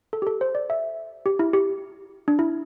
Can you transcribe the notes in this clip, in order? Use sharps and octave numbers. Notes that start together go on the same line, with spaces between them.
A4
G4
A4
C5
D5
E5
G4
E4
G4
D4
E4